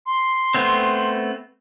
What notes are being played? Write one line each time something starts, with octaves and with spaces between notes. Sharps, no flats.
C6
A3 B3 C4